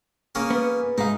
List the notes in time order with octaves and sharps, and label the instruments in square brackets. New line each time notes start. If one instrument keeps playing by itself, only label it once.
[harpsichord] A#3 C#4 G#4
[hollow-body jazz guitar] B3
[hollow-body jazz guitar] G#2 F5 [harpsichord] D#4